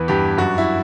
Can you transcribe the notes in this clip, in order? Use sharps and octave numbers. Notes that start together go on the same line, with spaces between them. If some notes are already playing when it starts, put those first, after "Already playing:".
Already playing: E2 E3 B4
G2 G4
F#2 F#4
E4